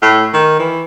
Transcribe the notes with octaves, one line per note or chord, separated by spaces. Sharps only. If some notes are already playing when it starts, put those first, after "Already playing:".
A2
D#3
E3